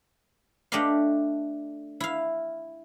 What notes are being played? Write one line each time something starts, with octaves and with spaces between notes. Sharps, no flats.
A3 D4 G4 D5 D#5 F5
E4 F5